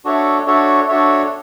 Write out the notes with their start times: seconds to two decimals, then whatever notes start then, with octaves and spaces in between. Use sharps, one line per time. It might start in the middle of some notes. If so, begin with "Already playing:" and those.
0.05 D4 F#4 A4 C#5 E5
0.46 D4 F#4 A4 C#5 E5
0.88 D4 F#4 A4 C#5 E5